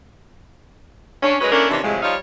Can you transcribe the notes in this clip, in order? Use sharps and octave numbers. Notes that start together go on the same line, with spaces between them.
C#4 D4
F#3 G#3 C#4 A#4 B4
A#3 C#4 D4 E4 A4 A#4
C3 D#3 E3 C#4 D4
A2 C3 F3 F#3 G#3
F3 G3 D#4 C#5 F5